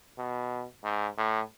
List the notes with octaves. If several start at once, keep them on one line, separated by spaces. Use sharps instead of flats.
B2
G#2
A2